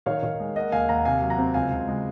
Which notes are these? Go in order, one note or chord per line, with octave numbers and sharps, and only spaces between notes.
D#3 C#5 F5
D#3
G#3
A#3 D#5 F#5
D#2 F5 G#5
D#2 F#5 A#5
C3 F5 G#5
F#3
F#5 A#5
C4
C#2 F5 G#5
C#2
G#3